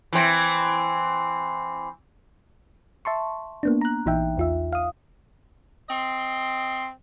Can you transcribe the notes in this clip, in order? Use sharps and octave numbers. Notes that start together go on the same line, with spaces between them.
E3 C4
E5 A5 C6 C#6
A#3 B3 D4
A#5 F#6
A#1 E3 D#4 E5 G5
E2 F4 E5
F5 D#6
C4 D#5 C6